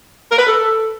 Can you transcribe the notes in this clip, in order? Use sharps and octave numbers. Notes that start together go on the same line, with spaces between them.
A#4
B4
A4